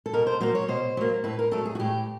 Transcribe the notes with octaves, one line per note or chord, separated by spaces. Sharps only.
A4
B2 A#4
C5
F#3 A#3 C5
C#5
B2 C5
F#3 A#3
A2 B4
A#4
F#3 A3 A4
G#4
F#4
A2 G4